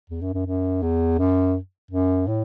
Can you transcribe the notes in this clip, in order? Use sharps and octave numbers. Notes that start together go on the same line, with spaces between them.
E2
F#2
F#2
F#2
E2
F#2
F#2
A2